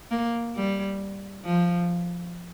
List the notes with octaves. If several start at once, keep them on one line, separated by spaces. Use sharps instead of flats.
A#3
G3
F3